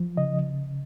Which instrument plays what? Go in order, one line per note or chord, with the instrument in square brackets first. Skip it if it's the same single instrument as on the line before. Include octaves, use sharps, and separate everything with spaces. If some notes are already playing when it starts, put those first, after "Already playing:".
Already playing: [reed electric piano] F3
C#3 D#5